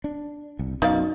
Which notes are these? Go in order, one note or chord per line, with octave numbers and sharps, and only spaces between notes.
D4
C2
B1 F#2 B2 D#4 D5 F5